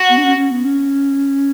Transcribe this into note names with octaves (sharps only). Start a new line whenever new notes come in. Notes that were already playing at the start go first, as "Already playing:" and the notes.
Already playing: F#4
B3
D4
C#4
C#4
B3
C#4